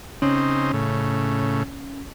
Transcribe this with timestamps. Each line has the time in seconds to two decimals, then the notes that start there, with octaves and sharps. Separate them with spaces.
0.22 C#3 C4 C#4 D#4
0.74 A2 C#3